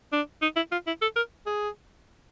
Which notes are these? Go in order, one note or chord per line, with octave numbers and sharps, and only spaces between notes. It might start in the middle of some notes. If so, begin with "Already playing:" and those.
D4
D#4
E4
F4
E4
A4
A#4
G#4